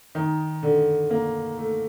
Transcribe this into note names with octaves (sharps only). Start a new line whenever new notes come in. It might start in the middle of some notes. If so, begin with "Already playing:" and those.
D#3
D3
A#3
A3